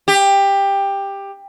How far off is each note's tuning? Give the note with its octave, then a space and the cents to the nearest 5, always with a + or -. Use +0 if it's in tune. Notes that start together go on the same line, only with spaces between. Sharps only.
G4 +15